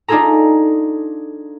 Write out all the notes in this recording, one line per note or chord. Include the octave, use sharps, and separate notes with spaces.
D4 D#4 F4 G#4 A4 A#5